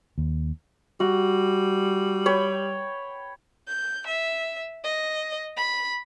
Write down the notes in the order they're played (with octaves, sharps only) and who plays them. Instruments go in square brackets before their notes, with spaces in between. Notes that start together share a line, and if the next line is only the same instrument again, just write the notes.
[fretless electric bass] D#2
[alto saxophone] G3 [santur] F#4
[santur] C#5 G5 B5
[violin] G6
E5
D#5
B5